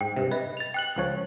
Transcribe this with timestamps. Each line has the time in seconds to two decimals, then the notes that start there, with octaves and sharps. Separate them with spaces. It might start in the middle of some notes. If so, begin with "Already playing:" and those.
0.01 G#2 G5
0.16 G2 C3
0.32 B4 D#5 E5
0.57 A6 F7
0.74 G5 F#6 F#7
0.96 C#2 F3 C#5